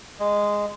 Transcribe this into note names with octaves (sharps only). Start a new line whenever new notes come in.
G#3